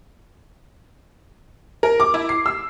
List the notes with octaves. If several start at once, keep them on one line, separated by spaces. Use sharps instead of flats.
A#4
D6
E4
C7
E6